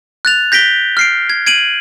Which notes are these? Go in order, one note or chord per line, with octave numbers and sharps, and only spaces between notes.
F#6 A6 F7
G6 A#6 B6 D7 G7
F6 C7 D7
G#6
G#6 D7 D#7 F#7